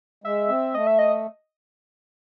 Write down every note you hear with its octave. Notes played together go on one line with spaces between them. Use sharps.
G#3 E5
C4
A3 D#5
E5
D#5